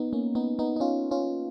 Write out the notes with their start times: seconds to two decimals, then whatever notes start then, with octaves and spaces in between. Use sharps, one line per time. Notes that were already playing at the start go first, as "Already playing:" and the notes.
Already playing: B3 D#4
0.13 A#3 C#4
0.35 B3 D#4
0.59 B3 D#4
0.76 D#4
0.80 C#4 F4
1.11 C#4 F4